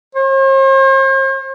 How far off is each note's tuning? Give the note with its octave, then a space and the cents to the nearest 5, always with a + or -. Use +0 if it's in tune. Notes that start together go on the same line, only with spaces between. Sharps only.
C5 +45